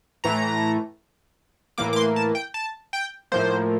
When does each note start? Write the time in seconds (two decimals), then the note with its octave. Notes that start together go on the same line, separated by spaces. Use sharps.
0.24 A2 E3 A3 A#5
1.78 A2 E3 A#3 D6
1.93 D6
1.96 C6
2.16 A5
2.35 G5
2.54 A5
2.93 G5
3.32 A2 F3 A#3 C5